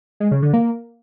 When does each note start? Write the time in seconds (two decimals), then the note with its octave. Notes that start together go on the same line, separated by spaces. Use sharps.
0.20 G#3
0.31 C#3
0.42 D3
0.53 A#3